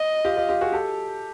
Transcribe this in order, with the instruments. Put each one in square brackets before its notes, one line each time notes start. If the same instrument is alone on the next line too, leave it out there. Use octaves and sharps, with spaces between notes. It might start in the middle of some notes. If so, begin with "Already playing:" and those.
Already playing: [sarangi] D#5
[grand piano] F4 G4
F4 G4
F4 G4
F#4 G#4
G4 A4